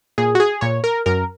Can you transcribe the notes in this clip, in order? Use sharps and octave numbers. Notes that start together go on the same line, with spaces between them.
A#2 G#4
F#4
G#4
A#2 C#5
A#4
F#2 A#4